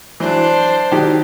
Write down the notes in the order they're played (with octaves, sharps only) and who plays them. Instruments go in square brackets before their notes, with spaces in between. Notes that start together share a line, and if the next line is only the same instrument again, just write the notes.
[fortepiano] E3 F#3 [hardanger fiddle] D4 C5
[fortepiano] D#3 F#3 G4